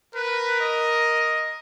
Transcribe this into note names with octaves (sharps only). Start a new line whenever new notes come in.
A#4 B4
D#5